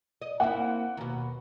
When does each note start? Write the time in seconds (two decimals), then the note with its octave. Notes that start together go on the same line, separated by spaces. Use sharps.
0.22 D#5
0.40 A#3 C4 E4 F#5
0.97 D#2 B2